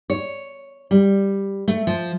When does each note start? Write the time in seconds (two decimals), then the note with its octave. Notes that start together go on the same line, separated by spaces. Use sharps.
0.10 C#5
0.91 G3
1.68 A3
1.87 F3